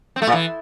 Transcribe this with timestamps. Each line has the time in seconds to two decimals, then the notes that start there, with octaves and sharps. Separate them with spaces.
0.16 C4
0.22 A3
0.27 A#2
0.33 E3